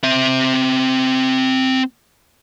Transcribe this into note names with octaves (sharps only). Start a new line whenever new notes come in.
C4 E5